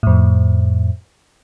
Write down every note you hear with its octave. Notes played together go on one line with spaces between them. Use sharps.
F2 A2